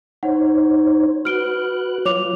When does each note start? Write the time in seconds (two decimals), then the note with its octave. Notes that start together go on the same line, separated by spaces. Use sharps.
0.23 D#4 C5 C#5 F#5
1.25 F#4 B4 F6 F#6 D7 G7
2.05 F#3 F4 C#5 D6 F7